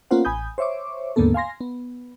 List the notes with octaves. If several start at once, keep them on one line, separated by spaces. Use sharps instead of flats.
A#3 B3 C#4 F4 C5 F#5
A1 G#5 B5 D#6 G6
C5 C#5 E5 C#6 D6
D#2 G#2 D3 A#3 B3 A4
F5 G#5 C6 A#6
B3